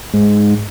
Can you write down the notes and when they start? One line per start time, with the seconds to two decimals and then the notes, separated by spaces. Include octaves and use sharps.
0.14 G#2